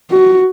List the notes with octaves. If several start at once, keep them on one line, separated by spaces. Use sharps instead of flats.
F#4